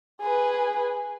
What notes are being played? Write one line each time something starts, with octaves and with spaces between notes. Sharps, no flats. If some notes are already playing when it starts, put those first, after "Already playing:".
G#4 B4